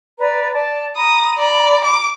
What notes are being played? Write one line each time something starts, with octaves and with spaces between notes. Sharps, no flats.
B4 D5 A#5
D5 A5
A#5 B5 D#6
D5
D6